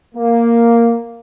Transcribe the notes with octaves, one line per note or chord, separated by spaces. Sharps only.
A#3